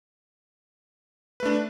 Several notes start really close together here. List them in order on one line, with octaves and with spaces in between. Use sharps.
B4 A3 D4